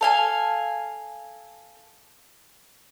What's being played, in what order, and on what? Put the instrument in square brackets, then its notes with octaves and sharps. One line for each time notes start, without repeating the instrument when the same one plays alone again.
[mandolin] A4 F5 G#5